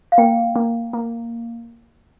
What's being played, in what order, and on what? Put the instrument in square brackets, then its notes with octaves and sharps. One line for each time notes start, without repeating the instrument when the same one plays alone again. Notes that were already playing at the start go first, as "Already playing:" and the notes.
[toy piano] F5
[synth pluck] A#3 [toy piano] G5
[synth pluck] A#3
A#3